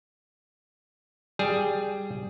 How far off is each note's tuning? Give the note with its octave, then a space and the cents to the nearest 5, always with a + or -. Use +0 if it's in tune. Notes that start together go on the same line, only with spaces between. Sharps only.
G3 +0 G#4 +0